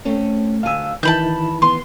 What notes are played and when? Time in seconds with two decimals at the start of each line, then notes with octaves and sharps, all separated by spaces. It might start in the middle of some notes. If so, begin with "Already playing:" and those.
0.05 A3 C4 C#4
0.63 D2 F5 G#5 E6
1.03 D#3 E3 E4 B4 A5 B5 G6
1.62 B3 C6